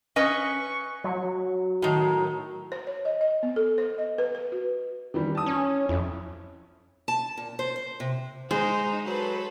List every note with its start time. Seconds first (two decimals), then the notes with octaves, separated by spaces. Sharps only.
0.16 C#4 B4 D#5 C#6
1.04 F#3
1.82 A2 D#3
2.72 C5
2.87 C#5
3.05 D#5
3.21 D#5
3.43 B3
3.56 A4
3.78 C5
3.98 D#5
4.18 B4
4.35 B4
4.52 F#4
5.14 D#3 E3 G3
5.35 A5 D#6
5.46 C#4
5.89 F2 E4
7.08 A5
7.37 A#2
7.59 C5
7.76 C5
8.00 C3
8.51 G#3 D#4 C5
9.06 F#3 A4 B4 C5